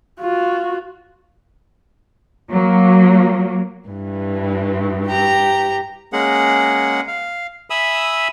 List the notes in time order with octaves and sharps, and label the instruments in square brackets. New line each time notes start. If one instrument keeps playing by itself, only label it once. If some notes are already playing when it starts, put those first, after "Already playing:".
[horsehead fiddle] F4 F#4
[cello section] F#3 A#3
[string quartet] G2 E3
[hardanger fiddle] G4 A#5
[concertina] G#3 A#3 C#4 G#4 F#5
F5
E5 G#5 B5 D#6 E6